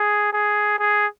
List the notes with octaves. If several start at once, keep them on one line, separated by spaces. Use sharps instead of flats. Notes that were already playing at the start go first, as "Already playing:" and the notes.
Already playing: G#4
G#4
G#4